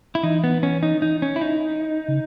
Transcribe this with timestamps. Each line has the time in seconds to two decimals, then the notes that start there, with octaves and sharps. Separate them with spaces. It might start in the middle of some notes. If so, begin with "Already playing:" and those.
0.15 E4
0.23 E3 D#4
0.44 B3
0.63 C#4
0.83 D#4
1.02 D#4
1.22 C#4
1.36 E4
1.41 D#4
2.08 C#3